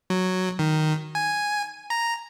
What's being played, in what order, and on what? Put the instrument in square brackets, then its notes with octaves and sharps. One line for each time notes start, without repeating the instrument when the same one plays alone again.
[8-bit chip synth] F#3
D#3
G#5
A#5